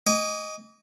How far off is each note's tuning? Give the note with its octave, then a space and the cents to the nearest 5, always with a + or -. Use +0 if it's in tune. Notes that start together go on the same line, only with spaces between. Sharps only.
D#5 +0 G#5 -25 D6 -40